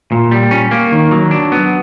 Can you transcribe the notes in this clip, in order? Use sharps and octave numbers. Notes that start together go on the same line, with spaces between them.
A#2
G3
C#4
A#3
D#3
F#3
D4
B3